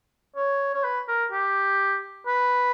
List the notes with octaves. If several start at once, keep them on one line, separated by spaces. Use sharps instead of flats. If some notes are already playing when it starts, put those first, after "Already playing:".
C#5
C#5
B4
A#4
G4
B4